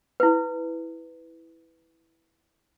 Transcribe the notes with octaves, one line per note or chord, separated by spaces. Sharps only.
E4 B4